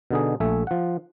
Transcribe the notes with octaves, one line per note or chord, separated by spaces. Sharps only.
B2 D3 D#4 G#4
A#1 A3 E5 G#5
F3 F#5